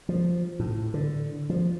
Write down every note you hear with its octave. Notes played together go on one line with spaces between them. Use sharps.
F3
A2
D3
F3